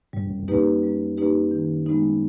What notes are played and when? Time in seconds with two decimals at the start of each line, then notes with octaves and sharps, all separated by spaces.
0.13 G2 G3
0.26 F#2
0.39 F2
0.48 F#2 A#3 D#4 G4 B4
0.83 G3
1.17 A#3 D#4 G4 B4
1.51 D#3
1.86 G#3 B3 D#4